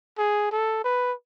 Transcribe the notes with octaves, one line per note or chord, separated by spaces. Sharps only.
G#4
A4
B4